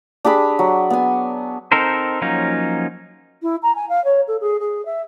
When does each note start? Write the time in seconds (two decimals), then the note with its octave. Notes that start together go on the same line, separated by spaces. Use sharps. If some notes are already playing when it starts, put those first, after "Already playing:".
0.25 D4 G4 G#4 B5
0.59 F#3
0.90 B3 G#5
1.72 C4 D#4 A4 A#4 C5
2.21 F3 F#3 A#3 C#4 D#4
3.42 E4
3.62 A#5
3.75 G#5
3.89 F5
4.04 C#5
4.27 A4
4.40 G#4
4.59 G#4
4.85 E5